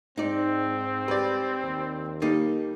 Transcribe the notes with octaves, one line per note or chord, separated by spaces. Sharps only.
G#2 C4 D#4 D5
G3 B4 D5
D#2
G3 A#3 D#4 A4